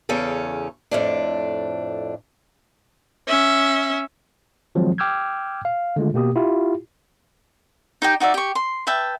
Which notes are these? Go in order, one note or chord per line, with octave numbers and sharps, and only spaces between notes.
E2 C#3 C#4 A4
F2 A2 D4
C#4 E5
D#3 F3 F#3 G#3 C4
G5 D6 E6 F6 G6 G#6
F5
D3 D#3 G#3 A3 F4
B2 A#3 G4 D#6
E4 F4 G4
D#4 G4 G5
D#4 F#4 D5 E5
G4 C#6
C6
B4 E5 G5 A5